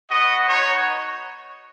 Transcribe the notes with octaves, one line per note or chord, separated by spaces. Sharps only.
B3 F#4 D#5
B3 D#4 F#4 C#5